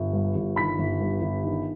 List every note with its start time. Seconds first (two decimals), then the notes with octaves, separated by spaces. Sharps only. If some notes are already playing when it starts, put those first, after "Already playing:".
Already playing: G1
0.13 G2
0.36 G1
0.56 D#3 B5 B6
0.79 G1
1.00 G2
1.22 G1
1.43 D#3